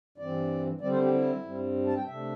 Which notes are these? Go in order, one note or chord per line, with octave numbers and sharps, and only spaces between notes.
G2 E3 C4 D5
D3 G3 C4 D5
C5
G4
E4
G2 G3 C4
A5
G5
C3 A3 D4 E5